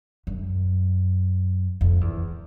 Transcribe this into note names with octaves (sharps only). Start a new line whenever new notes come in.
F#2
F2
E2